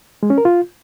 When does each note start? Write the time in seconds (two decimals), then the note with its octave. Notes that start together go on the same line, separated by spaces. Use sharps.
0.23 G#3
0.30 C#4
0.38 A#4
0.45 F4